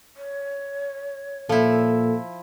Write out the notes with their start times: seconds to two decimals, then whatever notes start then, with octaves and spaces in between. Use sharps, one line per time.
0.16 C#5
1.49 A#2 F3 E4 A4